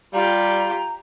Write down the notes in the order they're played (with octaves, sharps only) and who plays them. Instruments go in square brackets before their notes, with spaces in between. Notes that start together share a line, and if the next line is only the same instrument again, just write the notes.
[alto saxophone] G3 [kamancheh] F4 G4 [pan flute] A#5